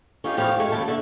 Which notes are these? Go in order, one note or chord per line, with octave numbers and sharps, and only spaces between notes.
C#4 D#4 F4 G4
E2 A2 F3 G4 G#4 F5
F#2 G#3 A3
D#2 C#3 E4 F4 A5
D3 E5